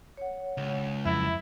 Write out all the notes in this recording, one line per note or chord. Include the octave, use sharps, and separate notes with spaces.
C#5 F#5
C#2
F2 F#3 E4 E5